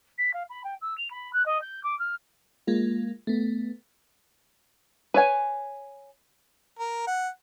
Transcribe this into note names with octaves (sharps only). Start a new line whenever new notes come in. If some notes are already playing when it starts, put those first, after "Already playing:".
B6
F5
B5
G5
E6
F7
B5
F#6
D#5
G6
D6
F6
G#3 A#3 F4
A3 B3
B4 C#5 G#5
A#4
F#5